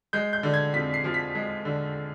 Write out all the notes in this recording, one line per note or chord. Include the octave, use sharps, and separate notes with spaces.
G#3 G6
G6
D3
G#6
F2 B6
C7
F3
B6
G#3
D3